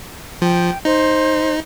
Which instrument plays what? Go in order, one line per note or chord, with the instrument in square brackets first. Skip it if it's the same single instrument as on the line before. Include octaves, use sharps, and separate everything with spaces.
[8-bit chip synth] F3 [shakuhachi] G5
[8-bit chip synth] D#4 [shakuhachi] C5